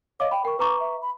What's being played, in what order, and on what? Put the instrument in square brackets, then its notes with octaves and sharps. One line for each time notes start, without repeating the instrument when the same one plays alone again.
[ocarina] C#5 [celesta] D#5 F5 D6
[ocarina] G5 [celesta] B5
[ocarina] A#4 [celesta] G5 C#6
[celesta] B4 A#5 C#6 [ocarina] D6
[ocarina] E5
B5